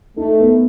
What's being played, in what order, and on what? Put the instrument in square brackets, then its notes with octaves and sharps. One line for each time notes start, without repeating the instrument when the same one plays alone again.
[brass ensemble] A3 [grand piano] D#4
[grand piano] B3